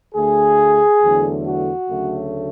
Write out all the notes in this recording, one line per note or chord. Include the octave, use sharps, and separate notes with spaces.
D2 D3 A3 G#4
E2 D3 F#3 A3
F#4
D2 C#3 F#3 A3